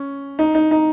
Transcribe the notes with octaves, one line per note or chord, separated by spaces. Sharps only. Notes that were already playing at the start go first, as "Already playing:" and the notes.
Already playing: C#4
D#4
D#4
D#4